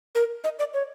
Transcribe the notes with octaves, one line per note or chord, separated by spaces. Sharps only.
A#4
D#5
D5
C#5